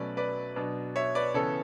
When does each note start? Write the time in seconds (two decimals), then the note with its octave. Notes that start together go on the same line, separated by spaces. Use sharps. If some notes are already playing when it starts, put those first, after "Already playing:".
Already playing: B2 F#3 A3 C#4 B4 D5
0.17 B4 D5
0.56 B2 F#3 B3 D4
0.96 C#5 E5
1.15 B4 D5
1.34 C#3 E3 B3 A4 C#5